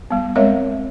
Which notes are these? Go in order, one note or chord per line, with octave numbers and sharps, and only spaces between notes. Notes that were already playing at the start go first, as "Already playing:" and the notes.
G3 B3
G#3 C4 A#4 C#5 D#5 E5